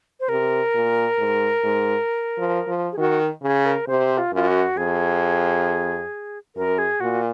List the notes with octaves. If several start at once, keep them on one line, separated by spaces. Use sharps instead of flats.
C5
C3 A#4
A#2
G#2
G#2
F3
F3
G#4
D#3 F#4
C#3 G#4
A#4
C3 C5
F4
F#2 F4
F#4
F2 G#4
F#2 A#4
G#4
A#2 F#4